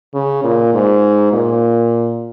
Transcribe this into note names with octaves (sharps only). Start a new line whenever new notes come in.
C#3
A#2
G#2
A#2